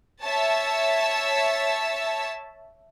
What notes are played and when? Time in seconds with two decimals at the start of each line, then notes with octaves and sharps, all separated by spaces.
0.23 C#5 E5 A5